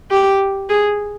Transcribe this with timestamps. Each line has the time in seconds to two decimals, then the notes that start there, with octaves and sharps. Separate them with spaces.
0.11 G4
0.69 G#4